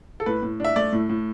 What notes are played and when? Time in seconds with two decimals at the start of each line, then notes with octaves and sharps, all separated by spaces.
0.20 A4
0.26 A2 B4
0.43 A2
0.60 D4 E5
0.76 A3 D5
0.92 A2
1.09 A2